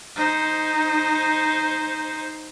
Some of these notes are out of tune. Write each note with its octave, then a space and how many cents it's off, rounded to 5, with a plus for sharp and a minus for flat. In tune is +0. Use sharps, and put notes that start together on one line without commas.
D#4 +0 C5 +0